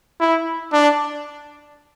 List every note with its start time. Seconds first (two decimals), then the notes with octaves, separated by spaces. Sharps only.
0.20 E4
0.73 D4